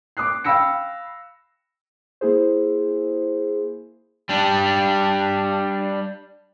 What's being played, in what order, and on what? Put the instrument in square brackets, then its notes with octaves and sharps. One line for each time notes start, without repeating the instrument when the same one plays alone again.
[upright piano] D6 D#6 F#6 C7
F5 G5 B5 E6 A#6 C#7
[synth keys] A#3 E4 G#4 C5
[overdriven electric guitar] G3 D4